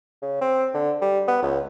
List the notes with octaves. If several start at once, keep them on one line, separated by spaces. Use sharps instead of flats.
C#3
C4
D3
G3
B3
C#2